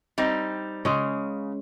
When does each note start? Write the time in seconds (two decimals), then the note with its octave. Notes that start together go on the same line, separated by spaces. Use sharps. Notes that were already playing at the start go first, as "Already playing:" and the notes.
0.18 G3 C4 D#4
0.85 C#3 G#3 C#4